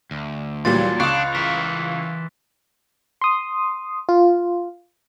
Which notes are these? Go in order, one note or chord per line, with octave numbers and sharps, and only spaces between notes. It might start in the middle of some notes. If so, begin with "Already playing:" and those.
D2
D#2 A#2 E3 F#3 G3 C6 A6
C#2 D4 F5 C#6 D#6 F#6
E3 A#4 B6
C6 D#6
F4